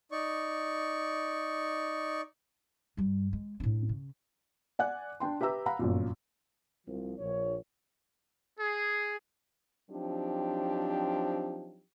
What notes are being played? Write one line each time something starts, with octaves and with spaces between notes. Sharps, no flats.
D#4 D5 C#6
G2 G3
G#3
A2 D4
C#3
D5 F#5 G#5 F#6
D4 G5 C6
G4 B4 E5 A#5 E6
F5 F#5 A#5 B5
G1 F#2 A#2
C2 F3
A#1 C#5
G#4
F3 F#3 C4 D4 D#4 G4